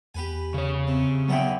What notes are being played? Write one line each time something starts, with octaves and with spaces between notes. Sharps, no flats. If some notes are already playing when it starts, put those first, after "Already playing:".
E2 G4 B4 G#5
C#3 C#5
C3
E2 F#3 B3 B4 E5 G5